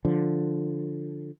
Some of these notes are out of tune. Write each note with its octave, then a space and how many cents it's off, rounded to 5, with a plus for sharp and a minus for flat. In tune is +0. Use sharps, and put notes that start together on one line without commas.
D3 +0 F3 +0